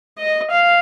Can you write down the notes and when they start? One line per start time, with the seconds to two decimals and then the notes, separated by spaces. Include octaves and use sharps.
0.18 D#5
0.51 F5